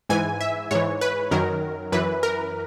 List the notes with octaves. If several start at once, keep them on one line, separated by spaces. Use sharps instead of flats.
G#2 E3 G#5
E5
G#2 E3 C#5
B4
F#2 D#3 F#3 A#4
F#2 E3 B4
A#4